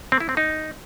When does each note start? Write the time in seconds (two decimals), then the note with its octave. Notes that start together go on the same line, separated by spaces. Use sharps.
0.12 C4
0.20 E4
0.29 C4
0.37 D#4